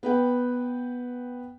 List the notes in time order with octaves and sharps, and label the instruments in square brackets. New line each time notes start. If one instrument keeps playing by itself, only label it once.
[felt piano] B3 B4 G5